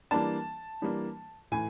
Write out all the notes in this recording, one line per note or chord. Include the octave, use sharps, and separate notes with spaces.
E3 G3 A#3 D4 A5
E3 G3 A#3 D4
A2 E3 G#5